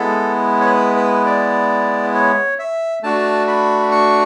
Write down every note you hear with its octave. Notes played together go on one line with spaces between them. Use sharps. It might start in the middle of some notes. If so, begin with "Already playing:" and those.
Already playing: G#3 B3 E4 A4
C#5
B4
B4
D5
C#5
E5
A3 D4 F#4 A5
B5
C#6